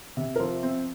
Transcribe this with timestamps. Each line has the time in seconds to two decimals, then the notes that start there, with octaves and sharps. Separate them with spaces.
0.17 C3
0.36 A#4
0.40 F3 C5
0.63 C4